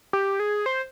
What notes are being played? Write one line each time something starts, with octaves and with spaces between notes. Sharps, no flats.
G4
G#4
C5